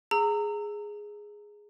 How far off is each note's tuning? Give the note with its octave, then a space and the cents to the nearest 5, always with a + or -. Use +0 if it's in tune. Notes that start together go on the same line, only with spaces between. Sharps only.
G#4 +0 A#5 -25 E6 +0